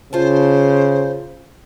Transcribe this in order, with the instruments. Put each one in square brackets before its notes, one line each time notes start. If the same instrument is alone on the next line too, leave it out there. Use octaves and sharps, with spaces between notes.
[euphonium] C#3 [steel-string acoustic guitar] F4 A5 [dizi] C5